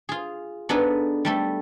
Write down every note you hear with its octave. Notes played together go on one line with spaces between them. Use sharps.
F4 G#4
B3 D4 D#4 G#4 A4 B4
G3 A3 A4